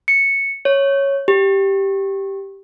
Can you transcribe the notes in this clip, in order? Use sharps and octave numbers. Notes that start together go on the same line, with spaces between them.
C#7
C#5
G4